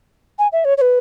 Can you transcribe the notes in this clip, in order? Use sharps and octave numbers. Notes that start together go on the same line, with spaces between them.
G#5
E5
C#5
C#5
B4